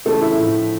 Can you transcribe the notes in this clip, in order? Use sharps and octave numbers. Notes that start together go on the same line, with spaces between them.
C#3 E3 A3 A4
E4 E5
A2 F3